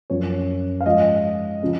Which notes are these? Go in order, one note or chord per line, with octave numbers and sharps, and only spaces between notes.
F#2 F3 C#5
F5
G#2 F3 D#5
C#3 F3